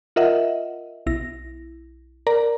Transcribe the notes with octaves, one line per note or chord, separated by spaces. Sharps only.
F4 A#4 D#5 E5 F#5
B1 E4 A#6
A#4 D5 A#5